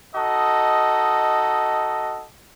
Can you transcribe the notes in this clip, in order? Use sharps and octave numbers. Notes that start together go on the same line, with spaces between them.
D#4 F#4 A4 D#5